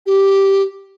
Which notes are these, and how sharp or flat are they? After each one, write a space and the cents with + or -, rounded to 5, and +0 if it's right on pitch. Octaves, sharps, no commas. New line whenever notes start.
G4 -5